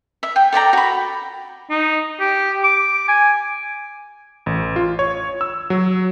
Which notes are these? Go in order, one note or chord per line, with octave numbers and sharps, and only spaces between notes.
E5
G5
A4 D5 G5 A#5
F#4 B5
D#4
G4
D6
G#5
A1
F4
C#5
E6
F#3